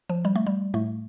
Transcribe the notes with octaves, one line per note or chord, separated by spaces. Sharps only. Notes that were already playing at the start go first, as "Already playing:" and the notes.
F3
G3
A3
G3
A2 A3